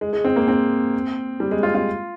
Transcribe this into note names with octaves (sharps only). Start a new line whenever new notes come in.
G#3
G#3
C4
A#3
C4
G3
G#3
F4
F4